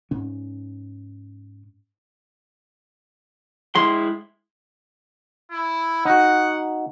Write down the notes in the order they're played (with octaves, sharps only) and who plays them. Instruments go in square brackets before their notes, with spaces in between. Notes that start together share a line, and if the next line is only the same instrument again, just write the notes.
[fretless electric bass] G#2 C#4
[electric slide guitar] G#3 E4 [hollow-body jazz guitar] C6
[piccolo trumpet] E4
[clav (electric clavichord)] D#4 F#4 [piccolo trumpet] F#5